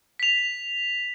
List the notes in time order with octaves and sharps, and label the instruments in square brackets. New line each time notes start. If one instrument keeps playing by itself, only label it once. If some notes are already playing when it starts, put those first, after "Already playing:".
[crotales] B6 F7